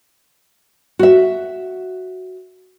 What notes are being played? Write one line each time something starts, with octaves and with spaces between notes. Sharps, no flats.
F#4 E5